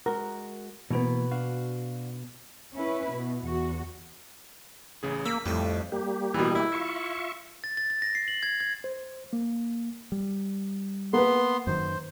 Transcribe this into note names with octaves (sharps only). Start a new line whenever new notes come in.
G#3 F#4 A#4
B2 E3 A#3 B3
D4 F#4 F5
C#4 E4 B4
B2
E2 F#4
A1 C#3 G#4
A#3 B5 E6
F2 A2 G3 A3
G3 A#3 G4
B2 E3
E4
F4 E5 C#6
A6
A6
A6
A#6
C7
F#7
G#6
G#6
C5
A#3
G3
A#3 B3 B4 C6
F#2 D#3 F#3 C5